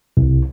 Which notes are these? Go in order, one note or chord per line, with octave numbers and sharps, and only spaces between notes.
C2